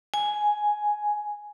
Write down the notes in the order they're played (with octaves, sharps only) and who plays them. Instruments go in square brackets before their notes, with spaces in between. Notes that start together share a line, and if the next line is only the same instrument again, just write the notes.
[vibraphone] G#5